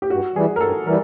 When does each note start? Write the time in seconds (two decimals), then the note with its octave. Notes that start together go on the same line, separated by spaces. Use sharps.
0.02 G4
0.10 G2 F#4
0.35 E3 G3 G#4
0.56 A#4
0.61 G2 A4
0.86 E3 G3 A#4